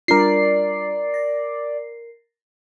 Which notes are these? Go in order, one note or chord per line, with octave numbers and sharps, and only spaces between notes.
G3 D4 F4 A#4 D5 C7
A6 A#6